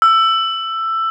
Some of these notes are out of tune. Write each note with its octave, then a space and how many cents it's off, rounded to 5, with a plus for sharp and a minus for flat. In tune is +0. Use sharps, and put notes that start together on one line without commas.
E6 +15